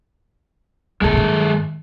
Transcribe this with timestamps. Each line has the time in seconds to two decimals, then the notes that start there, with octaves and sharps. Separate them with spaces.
1.01 D#2 D3 G#3 A4
1.13 G2 D#3